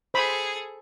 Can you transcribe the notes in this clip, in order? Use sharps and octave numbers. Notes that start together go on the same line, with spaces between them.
G#4 A4 C5 B5